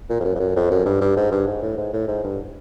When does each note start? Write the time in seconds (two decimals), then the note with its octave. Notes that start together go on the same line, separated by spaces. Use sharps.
0.09 A#2
0.20 F2
0.24 F#2
0.35 F2
0.40 F#2
0.56 F2
0.71 F#2
0.85 G2
1.01 G2
1.17 G#2
1.31 G2
1.47 G#2
1.63 A2
1.77 G#2
1.94 A2
2.08 G#2
2.24 G2